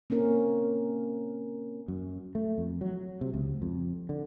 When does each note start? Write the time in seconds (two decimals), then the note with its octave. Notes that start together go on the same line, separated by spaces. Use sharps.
0.10 A#3 C4 C#4 A#4
1.88 F#2
2.35 A3
2.58 F2
2.81 F#3
3.21 C3
3.34 C#2
3.62 F2
4.09 D3